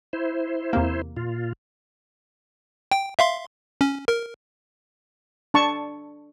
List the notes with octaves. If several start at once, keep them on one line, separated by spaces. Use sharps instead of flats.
E4 C5
E2 C3 A#3
A#2 F4
G5
E5 F5 C6
C#4
A#4
D4 A5 C#6